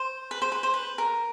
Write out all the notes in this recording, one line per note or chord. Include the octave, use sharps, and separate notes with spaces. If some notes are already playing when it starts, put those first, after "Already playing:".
Already playing: C5
B4
C5
B4
C5
B4
A#4